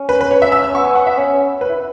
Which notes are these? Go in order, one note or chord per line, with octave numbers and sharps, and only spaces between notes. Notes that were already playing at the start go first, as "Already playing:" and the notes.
Already playing: C#4
B4
B4
C#5
E5
E6
E6
B3 C#6
G#5
F#5
E5
C#4 C#5
B4
E4